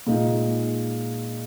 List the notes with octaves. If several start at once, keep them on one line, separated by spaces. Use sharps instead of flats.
A#2 G#3 D#4 G#4